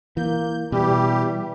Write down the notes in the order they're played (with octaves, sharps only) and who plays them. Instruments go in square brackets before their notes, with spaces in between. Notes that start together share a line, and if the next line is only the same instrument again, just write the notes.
[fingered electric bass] E3 [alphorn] A#3 [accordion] G6
[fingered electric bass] B2 [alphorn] E3 [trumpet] G3 [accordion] G4